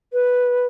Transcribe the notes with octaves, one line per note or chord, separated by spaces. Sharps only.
B4